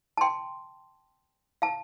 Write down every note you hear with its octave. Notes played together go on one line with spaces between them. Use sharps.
A5
G5 C6
F5 A5